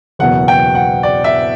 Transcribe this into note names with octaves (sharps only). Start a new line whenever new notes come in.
F#1 E2 B2 F#5
G5
F#5
D5
E5